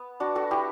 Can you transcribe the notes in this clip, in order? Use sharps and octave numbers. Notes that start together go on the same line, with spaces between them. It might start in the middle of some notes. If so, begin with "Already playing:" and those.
Already playing: B3
D4 F#4
F#4 A4
E4 G4